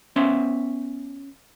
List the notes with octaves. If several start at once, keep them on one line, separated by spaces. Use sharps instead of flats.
B3 C#4 E5 C6